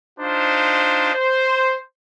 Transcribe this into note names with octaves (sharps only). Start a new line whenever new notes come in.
D4 D#4 F4 C5
C5